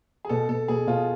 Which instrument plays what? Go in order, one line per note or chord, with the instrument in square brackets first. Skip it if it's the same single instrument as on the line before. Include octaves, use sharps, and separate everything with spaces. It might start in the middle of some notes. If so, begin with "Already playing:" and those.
[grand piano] G#4
[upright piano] B2 [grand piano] A4
[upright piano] B2 [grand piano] A4
[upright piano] B2 [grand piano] G#4
[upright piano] B2 [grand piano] F4